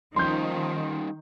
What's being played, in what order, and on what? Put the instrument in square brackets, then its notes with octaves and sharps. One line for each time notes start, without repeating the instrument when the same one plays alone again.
[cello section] D#3 [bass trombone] F3 [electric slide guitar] G3 C#4 D#4 [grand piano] C6 G6